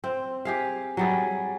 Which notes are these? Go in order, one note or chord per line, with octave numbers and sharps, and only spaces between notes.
C4
G4 G#4 F5
F#3 G3 G#4